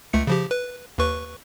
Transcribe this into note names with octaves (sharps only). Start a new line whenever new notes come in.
C#2 A3 C#7
C#3 F3 G4
B4
D#2 B4 C#6